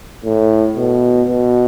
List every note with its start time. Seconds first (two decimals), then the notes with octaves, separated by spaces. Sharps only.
0.25 A2
0.77 B2
1.28 B2